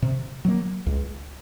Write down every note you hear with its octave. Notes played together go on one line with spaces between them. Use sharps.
C3
F#3 A#3
C#2